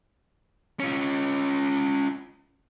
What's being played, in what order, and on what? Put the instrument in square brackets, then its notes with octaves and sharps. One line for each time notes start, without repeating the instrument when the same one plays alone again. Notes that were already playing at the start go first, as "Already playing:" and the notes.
[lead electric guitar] C#4 F4